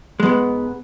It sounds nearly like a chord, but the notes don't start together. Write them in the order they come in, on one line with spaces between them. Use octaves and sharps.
G#3 B3 G#2